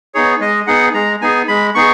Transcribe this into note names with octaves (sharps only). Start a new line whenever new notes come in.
B3 D#4 G#4 C#5
G#3 D#5
B3 D#4 G#4 F#5
G#3 A#5
B3 D#4 G#4 G#5
G#3 B5
B3 D#4 G#4 C#6